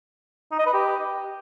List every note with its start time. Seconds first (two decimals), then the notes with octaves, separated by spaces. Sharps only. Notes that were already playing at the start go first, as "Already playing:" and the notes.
0.51 D#4
0.59 D#5
0.66 B4
0.73 G4